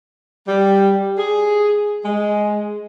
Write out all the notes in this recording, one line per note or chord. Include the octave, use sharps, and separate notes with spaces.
G3
G#4
G#3